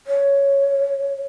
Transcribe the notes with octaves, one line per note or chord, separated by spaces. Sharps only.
C#5